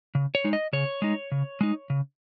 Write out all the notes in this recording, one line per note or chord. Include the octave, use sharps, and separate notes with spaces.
C#3
C#5
G#3 D#4
D#5
C#3 C#5
G#3 D#4
C#3
G#3 D#4
C#3